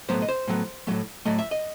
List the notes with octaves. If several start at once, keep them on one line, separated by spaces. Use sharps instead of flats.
A2 F#3 B3 C5
D#5
C5
A2 F#3 B3
A2 F#3 A3
A2 F#3 A3 D#5
E5
D#5